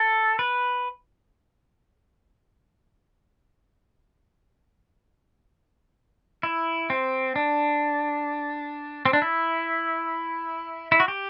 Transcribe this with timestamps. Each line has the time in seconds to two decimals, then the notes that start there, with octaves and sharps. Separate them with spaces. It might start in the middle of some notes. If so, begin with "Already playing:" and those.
Already playing: A4
0.39 B4
6.43 E4
6.90 C4
7.36 D4
9.05 C4
9.13 D4
9.22 E4
10.92 E4
11.00 F#4
11.08 G4